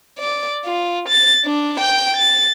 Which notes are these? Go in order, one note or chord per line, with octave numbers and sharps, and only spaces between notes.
D5
F4
A6
D4
G5 G6
A6